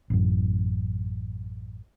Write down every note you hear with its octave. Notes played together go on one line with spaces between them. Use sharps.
A1 F#2